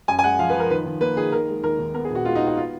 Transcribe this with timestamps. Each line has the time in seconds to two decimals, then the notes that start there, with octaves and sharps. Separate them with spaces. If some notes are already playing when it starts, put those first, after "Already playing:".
0.08 F#2 G#5
0.19 G#5
0.23 G#3 F#5
0.39 F3 F5
0.50 B4
0.55 F3
0.60 A#4
0.70 D#3 B4
0.86 D#3
1.01 A#3 B4
1.17 D#3 G#4
1.32 D#3 A#4
1.48 G#3
1.63 D#2 A#4
1.79 D#2
1.94 B3 A#4
2.05 G#4
2.10 A#1
2.15 F#4
2.25 G#3 F4
2.35 D#4
2.41 B3
2.47 F#4
2.57 F4